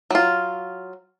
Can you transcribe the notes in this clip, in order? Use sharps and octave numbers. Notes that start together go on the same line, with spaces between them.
F#3 F4